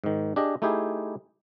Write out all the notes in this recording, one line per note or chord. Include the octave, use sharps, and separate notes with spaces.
G#2 D#3
D4 G4 G#4 D#5
A3 D#4 E4 G4 G#4